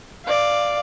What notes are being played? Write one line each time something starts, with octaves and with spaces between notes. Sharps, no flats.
D5 F5